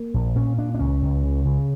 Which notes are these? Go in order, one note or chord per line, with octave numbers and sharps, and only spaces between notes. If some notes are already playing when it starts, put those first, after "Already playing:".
Already playing: A#3
A#1
A#2 C#4
A#2 D4
D4
C#2 C#4
C#2
C#3
C#3